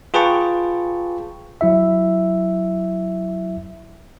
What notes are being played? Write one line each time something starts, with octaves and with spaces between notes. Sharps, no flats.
F4 G#4 B4 G5 A5 C#6
F#3 E4 E5